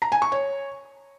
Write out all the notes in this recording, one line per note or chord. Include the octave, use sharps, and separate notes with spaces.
A#5
G#5
C#6
C#5